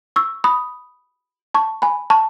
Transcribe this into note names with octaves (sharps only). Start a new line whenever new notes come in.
C#6 E6
B5 D#6
A5 C#6
G#5 B5
A5 C#6